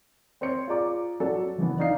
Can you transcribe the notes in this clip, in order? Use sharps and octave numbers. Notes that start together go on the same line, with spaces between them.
C4 C5 C#5 C#7
F4 G#4 D5 A#5 D6
F#3 C#4 F#4 A4 D5
F#1 E3 B3
D4 D#4 F5 C7